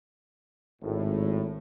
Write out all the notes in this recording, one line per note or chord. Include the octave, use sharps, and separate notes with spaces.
G#1 A2